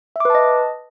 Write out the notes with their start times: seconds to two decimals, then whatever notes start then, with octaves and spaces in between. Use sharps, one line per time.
0.16 E5
0.20 D6
0.25 B4
0.30 A5
0.35 D#5